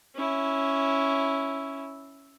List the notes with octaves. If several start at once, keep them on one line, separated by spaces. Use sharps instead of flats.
C#4 E4